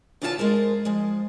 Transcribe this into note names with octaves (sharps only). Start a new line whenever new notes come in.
E2 C#3 E4 F4 G4 A5
G#3 G#4 A#4 C5
F3 G#3